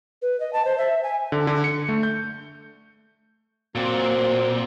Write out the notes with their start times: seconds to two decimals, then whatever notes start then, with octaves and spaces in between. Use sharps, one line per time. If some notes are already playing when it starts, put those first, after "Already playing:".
0.22 B4
0.40 D#5
0.53 A5
0.65 C5
0.78 E5
1.03 G#5
1.32 D3
1.47 D3
1.64 C#7
1.89 A3
2.03 G6
3.75 A#2 F#3 A#3 C4